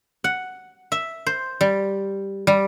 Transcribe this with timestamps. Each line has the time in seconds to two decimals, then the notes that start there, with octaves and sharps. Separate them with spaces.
0.24 F#5
0.92 E5
1.26 C5
1.61 G3
2.47 G3